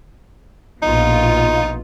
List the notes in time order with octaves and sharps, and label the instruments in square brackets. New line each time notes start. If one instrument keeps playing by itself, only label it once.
[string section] A#1 B2 F4 [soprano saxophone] D#4